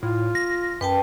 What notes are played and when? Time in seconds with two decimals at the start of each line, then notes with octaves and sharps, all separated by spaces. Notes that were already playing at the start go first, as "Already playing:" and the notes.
0.03 A2 F4
0.35 A#6
0.81 F#2 B4 G5 A5